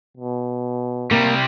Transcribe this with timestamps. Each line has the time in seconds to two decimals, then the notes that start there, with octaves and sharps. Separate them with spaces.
0.17 B2
1.11 C3 G3 A#3